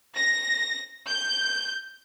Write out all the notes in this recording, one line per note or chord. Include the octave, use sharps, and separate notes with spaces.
A#6
G6